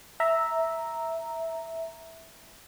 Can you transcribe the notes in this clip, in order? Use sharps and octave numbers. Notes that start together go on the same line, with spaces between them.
E5 A#5